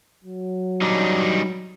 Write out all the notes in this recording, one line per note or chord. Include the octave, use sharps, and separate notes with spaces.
F#3
G3 D4 D#4